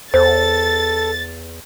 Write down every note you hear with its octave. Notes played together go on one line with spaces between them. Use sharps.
E2 A4 C5 A6